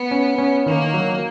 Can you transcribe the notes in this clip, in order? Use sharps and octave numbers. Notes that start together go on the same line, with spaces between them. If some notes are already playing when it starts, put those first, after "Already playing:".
Already playing: B3
C#4
C#4
D#3 A#3
F#3